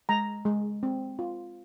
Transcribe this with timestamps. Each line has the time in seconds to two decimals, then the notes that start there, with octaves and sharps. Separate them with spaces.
0.09 G#3 A#5
0.45 G#3
0.83 C4
1.19 F4